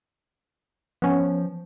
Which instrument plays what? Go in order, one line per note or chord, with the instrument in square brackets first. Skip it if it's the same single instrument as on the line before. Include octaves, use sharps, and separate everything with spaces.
[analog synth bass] F3 [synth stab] B3 C#4